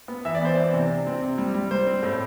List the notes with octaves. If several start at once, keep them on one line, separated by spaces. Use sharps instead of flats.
B3
E3 E5
D5
B3 C5
E3 D5
C3
C3
C4
C3
G3
G3
G3 C5
C4
A2